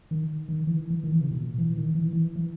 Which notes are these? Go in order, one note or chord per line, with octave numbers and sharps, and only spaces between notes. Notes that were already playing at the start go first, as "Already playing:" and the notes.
D#3
D#3
E3
E3
D#3
E3
C#3
B2
A#2
E3
D#3
E3
E3
E3